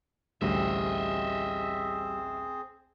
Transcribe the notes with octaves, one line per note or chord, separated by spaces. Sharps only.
A1 D2 G3 C4 F#4 G#4 D#5 E5